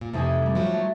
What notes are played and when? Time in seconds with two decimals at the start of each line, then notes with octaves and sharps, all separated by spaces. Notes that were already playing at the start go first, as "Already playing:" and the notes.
0.01 A#2
0.13 F2 C3 E3 A3 D#4 G#5
0.42 G3 A3
0.55 F3 F#3
0.74 A3